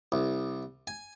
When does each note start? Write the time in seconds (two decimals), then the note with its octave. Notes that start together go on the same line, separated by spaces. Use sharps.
0.12 C2
0.87 G#5